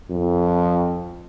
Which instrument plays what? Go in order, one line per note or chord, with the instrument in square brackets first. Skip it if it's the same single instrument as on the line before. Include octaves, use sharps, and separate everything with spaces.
[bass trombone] F2